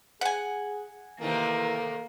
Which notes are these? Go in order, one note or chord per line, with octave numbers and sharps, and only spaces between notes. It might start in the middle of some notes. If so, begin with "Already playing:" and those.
G#4 F#5 G#5
C3 D#3 E3 A3 A#3